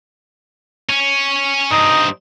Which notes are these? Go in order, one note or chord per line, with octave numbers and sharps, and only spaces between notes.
C#4
G2 C4 D#4